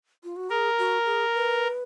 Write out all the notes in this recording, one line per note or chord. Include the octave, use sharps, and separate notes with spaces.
F4
F#4
G#4 A#4
F#4
G#4
B4